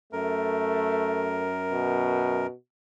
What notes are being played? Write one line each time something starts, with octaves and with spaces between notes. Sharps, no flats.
F#2 A3 A#4
B2